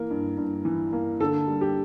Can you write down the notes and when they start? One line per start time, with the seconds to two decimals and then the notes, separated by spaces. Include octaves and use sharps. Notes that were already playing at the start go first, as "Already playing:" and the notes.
Already playing: E3 A#3 A#4
0.10 G2
0.37 G2
0.65 E3
0.93 A#3
1.20 D3 A4
1.47 G3
1.61 G4